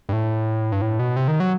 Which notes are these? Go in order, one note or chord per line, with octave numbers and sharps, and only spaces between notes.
G2
A2
G2
A2
B2
C3
D#3
F#3